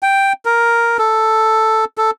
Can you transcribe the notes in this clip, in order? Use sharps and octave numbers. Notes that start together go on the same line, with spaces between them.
G5
A#4
A4
A4